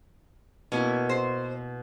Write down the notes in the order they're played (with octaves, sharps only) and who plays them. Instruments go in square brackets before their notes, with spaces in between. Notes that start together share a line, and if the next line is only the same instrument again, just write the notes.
[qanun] B2 A#3 E4 [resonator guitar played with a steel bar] C#4
[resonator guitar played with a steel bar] C5